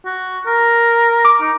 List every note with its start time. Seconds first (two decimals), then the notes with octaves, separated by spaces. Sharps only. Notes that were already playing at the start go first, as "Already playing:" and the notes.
0.06 F#4
0.46 A#4
1.25 D6
1.41 D#4